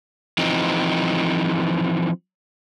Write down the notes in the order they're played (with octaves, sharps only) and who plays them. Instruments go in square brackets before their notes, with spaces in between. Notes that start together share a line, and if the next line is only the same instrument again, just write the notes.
[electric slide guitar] E3 F3 C4 D#4